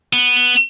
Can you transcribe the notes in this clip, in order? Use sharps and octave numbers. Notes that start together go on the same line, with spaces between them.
B3